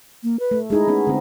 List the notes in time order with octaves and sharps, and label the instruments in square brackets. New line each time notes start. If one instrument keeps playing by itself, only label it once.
[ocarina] A#3
B4
[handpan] A3
[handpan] G#3 D#4 E4 [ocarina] G#4
[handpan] B3 C#4 D#4
D3 C4